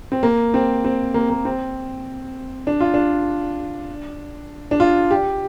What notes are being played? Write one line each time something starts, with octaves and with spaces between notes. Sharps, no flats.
C4
A#3
C4
C4
A#3
A#3
C4
D4
F4
D4
D4
F4
G4